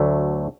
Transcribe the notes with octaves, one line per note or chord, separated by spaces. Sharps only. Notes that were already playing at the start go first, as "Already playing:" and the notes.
Already playing: D2 D3 F#3 A3